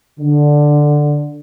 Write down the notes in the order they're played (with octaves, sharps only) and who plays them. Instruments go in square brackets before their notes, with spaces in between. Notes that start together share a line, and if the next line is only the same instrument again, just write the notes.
[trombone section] D3